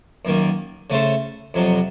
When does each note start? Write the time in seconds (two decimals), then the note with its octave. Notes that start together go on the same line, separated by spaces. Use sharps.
0.25 F#2 D#3 A#3
0.90 C#3 A3 C#4 A4 C5
1.54 F2 C3 F#3